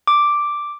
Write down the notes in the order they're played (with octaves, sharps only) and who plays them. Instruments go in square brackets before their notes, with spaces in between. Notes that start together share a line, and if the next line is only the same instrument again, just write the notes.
[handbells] D6